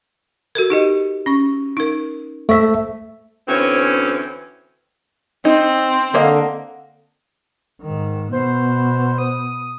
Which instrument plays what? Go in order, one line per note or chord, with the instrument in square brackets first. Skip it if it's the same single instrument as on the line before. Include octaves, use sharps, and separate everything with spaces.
[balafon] F#4 A4 A#4
D#4 G4 D#5
C#4 C#6
D#4 A#4
[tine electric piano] A3 E5 [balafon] C5 C#6
[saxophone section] D2 E3 C4 C#4
[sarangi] C4 [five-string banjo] D#4
[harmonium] D3 [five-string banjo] A#3 D#5 F5
[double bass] G#2 D#3
[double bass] B2 B3 [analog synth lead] C5
[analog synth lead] D#6